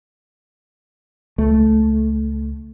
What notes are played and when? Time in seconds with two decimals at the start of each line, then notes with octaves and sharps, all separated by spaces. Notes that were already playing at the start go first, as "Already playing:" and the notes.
1.38 C#2 A3